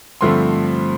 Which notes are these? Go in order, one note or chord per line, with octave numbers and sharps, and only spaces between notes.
G2 D3 F3 A3 C4 C6